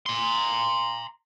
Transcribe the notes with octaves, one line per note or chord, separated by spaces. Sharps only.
A#5 C6